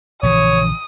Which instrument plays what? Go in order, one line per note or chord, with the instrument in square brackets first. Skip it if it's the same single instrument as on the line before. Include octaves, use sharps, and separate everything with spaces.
[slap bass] A#1 C#3 E3 [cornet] C#5 [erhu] D#6